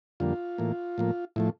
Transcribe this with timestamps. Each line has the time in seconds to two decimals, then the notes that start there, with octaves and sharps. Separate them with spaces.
0.20 F2 D3 G3 A#3 F4
0.58 A2 E3 A#3
0.98 A2 F3 A#3
1.36 A2 F3 A3 E4